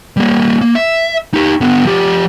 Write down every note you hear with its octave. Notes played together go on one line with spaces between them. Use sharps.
G3 A#3
A#3
E5
D#4 G4
D3 B3
F3 G4